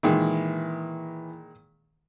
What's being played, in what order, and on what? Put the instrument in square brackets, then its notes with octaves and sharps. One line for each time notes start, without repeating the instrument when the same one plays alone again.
[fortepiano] A#2 D#3 G#3 [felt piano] E3